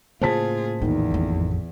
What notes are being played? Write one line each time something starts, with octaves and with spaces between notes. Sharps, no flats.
A2 C#3 A#3 F4 G#4 C5 A5 B6
A#1 E2 D#3 B3
A1 F2